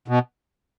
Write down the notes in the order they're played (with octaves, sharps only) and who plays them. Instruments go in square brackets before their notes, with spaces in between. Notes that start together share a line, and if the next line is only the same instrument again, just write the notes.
[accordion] B2